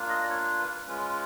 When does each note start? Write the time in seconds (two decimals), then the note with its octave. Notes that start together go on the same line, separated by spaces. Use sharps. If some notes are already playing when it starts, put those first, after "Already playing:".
Already playing: A#3 D4 F4
0.09 D#5
0.23 D5
0.29 C#5
0.58 B4
0.87 G#3 C#4 F4 B4